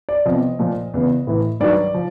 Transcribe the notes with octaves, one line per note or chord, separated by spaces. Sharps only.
D5
E2 C3 F3 D#5
A#2 F3
E2 C#3 E3
A2 E3
G2 D#3 F#3 D5
F3